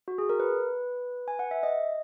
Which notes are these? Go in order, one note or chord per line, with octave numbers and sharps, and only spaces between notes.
F#4
G#4
A#4
B4
G#5
F#5
E5
D#5